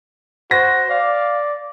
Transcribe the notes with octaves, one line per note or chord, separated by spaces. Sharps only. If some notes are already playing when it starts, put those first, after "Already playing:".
F#4 C5 A#6
D5 F5